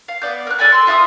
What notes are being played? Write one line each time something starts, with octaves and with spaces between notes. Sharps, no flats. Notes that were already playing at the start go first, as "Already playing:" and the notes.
F5
B3 D5 G6
A#4 F#6
A4 D5 G#5 B5
C6 E6
F4 E5 C6 D#6